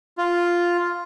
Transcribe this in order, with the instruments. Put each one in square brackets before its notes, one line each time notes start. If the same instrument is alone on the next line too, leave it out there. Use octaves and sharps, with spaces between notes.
[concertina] F4